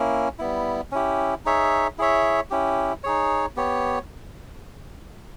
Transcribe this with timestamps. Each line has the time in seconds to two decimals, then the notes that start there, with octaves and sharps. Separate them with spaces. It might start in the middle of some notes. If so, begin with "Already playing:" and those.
Already playing: A#3 C#4 E4
0.39 G3 B3 E4
0.92 C#4 E4 G4
1.45 D#4 G#4 C#5 E5
1.98 E4 G#4 C#5 E5
2.50 C#4 E4 G4
3.04 D#4 G#4 C#5
3.56 B3 G4 C#5